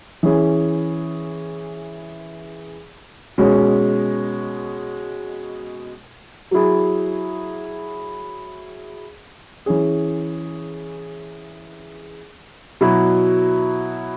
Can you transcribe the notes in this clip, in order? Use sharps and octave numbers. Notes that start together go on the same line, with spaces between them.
E3 C#4 G#4
B2 G#3 C#4
F#3 E4 G#4
E3 C#4 G#4
B2 F#3 E4